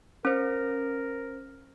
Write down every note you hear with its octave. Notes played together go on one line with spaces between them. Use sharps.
C#4 A#4 C5